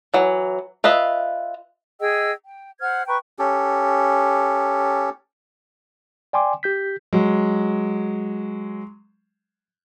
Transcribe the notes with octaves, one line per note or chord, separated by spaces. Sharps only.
E3 F#3
F4 B4 D#5 E5
G#4 D#5 G5 E6
G5
C5 F#5 F6 G#6
B4 G5 A#5 C#6
C#4 G4 A4
D5 G5 G#5 C6 D6
G4 G6 B6
F#3 G#3